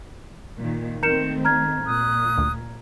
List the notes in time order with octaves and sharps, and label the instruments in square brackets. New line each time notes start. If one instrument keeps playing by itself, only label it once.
[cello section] A#2 D#3
[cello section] D#3 A3 C4 [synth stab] A#4 [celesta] G6 C#7 E7
[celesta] A#5 F6 G#6
[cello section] A#2 [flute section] D#6 F#6
[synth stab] D2